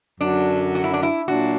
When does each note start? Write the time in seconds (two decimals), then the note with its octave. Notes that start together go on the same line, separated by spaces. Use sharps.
0.20 F#2 D3 F#3 D4
0.75 F#4
0.84 E4
0.93 D4
1.03 E4
1.28 A#2 F#3 D4 F#4